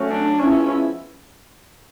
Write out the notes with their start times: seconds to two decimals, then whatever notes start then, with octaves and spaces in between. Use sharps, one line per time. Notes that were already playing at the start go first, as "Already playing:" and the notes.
Already playing: F#3 A3 C#4
0.10 D4
0.39 F3 G#3 B3 C#4 E4